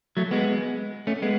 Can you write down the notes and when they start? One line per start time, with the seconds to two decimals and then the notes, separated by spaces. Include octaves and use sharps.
0.17 F#3 A3
0.31 G#3 B3
1.07 A3 C#4
1.22 G#3 B3